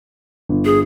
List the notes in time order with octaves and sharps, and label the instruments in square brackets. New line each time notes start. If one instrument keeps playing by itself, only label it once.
[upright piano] G1
[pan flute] G#4